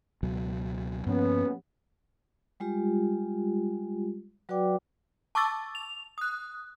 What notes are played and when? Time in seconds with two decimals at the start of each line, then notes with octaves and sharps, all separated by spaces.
0.23 C#2 B2 F#3
1.07 G2 F3 A#3 B3 C#4
2.60 G3 G#3 F4 G4
4.49 F#3 F#4 B4 D5 G5 D6
5.35 A5 C#6 D6 E6 A6
5.75 F7
6.18 D#6 F#6